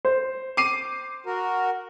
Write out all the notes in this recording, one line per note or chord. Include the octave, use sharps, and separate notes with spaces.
C5
D6 C7 D#7
F#4 A#4